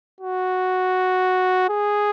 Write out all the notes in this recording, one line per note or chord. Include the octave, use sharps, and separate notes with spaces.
F#4
G#4